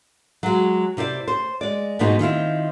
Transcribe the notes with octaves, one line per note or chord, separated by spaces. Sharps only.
F#3 G#3
C3 E4 C5 D5
C5
G#3 D5
G#2 B2 F3 B3 D#4 G#4
D#3 F3 C4 E4